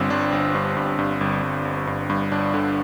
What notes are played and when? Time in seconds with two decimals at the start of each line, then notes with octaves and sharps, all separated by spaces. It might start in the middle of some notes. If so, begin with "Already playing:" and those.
Already playing: G1 G2 C4
0.10 G1 D4
0.32 G1
0.55 G2
0.77 G2
0.99 G2
1.21 G1
1.42 G1
1.65 G1
1.87 G2
2.10 G2
2.32 G1 D4
2.54 D3